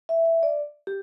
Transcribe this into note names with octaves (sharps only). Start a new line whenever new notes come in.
E5
E5
D5
G4